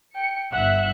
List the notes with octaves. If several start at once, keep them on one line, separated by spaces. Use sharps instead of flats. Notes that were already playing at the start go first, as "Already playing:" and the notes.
G5 C#7
G1 E5 F#5 F#6